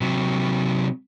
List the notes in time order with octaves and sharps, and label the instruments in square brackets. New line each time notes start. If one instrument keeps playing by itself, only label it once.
[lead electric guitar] C3 F#3